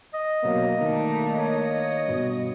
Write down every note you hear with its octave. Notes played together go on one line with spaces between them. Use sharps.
D#5
B2 F#3 A#3
D#3 A3 D4 D#4
C#5 D#5
G2 B2